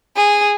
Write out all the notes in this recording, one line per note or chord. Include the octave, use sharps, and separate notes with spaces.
G#4